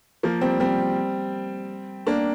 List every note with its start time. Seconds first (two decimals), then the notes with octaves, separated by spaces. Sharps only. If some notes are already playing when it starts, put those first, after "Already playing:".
0.23 F3 A#3
0.41 G3 C4
0.60 G3 C4
2.07 A#3 D4